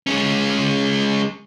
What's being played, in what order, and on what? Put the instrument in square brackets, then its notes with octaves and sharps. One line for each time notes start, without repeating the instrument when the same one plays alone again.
[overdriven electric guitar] G#3 C#4